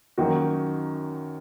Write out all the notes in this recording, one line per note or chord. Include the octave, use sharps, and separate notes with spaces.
F#2 D#3 A#3 D#4 F#4